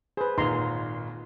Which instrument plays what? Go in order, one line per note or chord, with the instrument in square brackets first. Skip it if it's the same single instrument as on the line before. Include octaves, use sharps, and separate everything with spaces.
[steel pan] G#4 B4 [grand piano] C5
[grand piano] G#1 A#2 [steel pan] D#4 A#5 C6